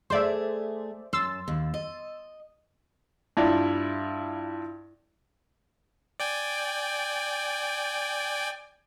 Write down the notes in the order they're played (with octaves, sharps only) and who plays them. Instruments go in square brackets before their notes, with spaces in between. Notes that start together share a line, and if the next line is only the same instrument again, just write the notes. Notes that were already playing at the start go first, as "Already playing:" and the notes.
[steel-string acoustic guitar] A3 G#4 [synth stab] C5 D5 E5
[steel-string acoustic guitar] F#2 [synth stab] C6 E6 A6
[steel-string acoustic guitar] D#2
D#5
[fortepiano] G2 E4 F4 D5
[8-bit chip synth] D5 G5 G#5